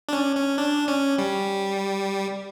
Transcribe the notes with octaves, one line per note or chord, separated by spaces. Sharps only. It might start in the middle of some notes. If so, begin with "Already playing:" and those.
D4
C#4
C#4
D4
C#4
G3